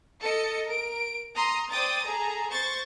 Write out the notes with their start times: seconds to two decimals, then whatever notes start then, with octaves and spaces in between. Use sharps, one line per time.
0.21 A4 D#5 C#7
0.66 A#4 D7
1.34 A#5 C6 D#6
1.70 C5 D5 G5 D#6 A6
2.01 G#4 A4 A#5
2.49 C5 C#6 A6